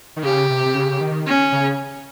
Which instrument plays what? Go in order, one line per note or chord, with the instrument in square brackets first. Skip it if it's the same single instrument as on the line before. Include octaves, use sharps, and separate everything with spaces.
[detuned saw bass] D#3
[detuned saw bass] C#3 [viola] G4
[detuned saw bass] C3
C3
C#3
D#3
[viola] C#4
[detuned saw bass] C#3